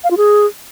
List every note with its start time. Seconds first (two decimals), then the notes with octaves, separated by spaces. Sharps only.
0.04 F5
0.11 F4
0.17 G#4